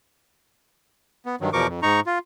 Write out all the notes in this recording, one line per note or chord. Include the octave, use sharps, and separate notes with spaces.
B3
G2 D#3 F#3
E2 B2 F3 A#4 C#6 D6
F2
G#2 D#4 A#5 C#6
F4